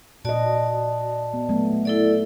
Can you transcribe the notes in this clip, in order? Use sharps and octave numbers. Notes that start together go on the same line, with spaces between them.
A#2 F#4 D5 D#5 A5
B3
F#3 A3 B3
E4 A4 D5